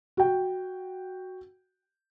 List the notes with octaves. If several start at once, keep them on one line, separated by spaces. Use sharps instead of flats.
F#4 G5